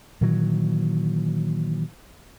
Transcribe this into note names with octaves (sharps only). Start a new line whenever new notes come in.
A#2 D#3 E3 F#3